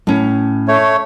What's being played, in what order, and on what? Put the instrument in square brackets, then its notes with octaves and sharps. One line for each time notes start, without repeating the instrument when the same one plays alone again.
[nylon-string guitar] A2 C#4
[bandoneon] A3 C#5